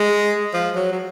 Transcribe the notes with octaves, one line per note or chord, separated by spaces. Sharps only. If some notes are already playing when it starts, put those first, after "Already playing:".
Already playing: G#3
F3
F#3
F#3